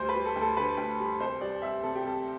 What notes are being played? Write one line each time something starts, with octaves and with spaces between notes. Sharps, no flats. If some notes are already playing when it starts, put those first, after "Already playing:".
Already playing: D2 G3 C5
B4
G3
A4
D2
A4
D3 B4
D2
G3
C2 C5
G3 D5
C2 E5
C3 A4
G4
C2 A4